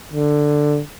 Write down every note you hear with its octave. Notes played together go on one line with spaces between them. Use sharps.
D3